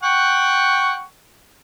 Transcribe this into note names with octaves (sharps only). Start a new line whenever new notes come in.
F#5 G5 C#6